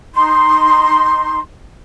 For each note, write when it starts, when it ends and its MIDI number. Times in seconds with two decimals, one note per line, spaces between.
0.14 1.38 63
0.14 1.38 84